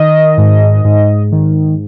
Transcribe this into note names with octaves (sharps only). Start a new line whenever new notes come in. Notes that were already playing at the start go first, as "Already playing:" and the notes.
Already playing: D#3 D#5
G#2
G#2
D#3